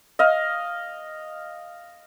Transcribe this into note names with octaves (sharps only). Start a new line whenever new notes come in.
D#5 F5